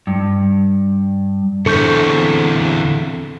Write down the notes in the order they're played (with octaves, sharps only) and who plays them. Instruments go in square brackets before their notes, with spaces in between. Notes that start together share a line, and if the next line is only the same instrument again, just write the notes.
[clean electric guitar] G2
[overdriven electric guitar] E2 [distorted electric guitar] D3 C4 [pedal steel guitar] A4 C#6 G6